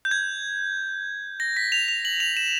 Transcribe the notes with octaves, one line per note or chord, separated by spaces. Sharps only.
G6
G#6
A#6
B6
F7
F7
F#7
F7
E7